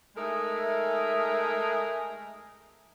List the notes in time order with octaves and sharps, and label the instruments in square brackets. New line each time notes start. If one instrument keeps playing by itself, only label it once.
[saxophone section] G#3 A3 D#4 G#4 A#4 E5